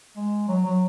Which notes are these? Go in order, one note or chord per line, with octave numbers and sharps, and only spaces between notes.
G#3
F#3
F#3